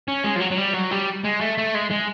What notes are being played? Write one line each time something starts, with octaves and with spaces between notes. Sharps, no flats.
C#4
G#3
F3
F#3
F#3
G3
F#3
G3
G#3
A3
A3
G#3
G#3